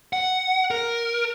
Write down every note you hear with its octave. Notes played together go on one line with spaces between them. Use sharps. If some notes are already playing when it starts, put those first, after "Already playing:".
F#5
A#4